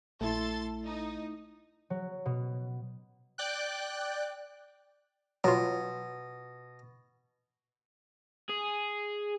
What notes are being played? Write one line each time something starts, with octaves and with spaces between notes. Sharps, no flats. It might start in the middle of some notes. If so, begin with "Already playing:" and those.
A#1 A3 E4 A4 C6 A6
D#4
F#3
B2
D5 G5 F#6
B2 F#3 F4
G#4